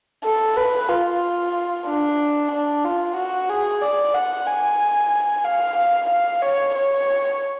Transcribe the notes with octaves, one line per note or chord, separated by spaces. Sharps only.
A4
B4
F4
D4
D4
F4
F#4
G#4
D5
F#5
G#5
F5
F5
F5
C#5
C#5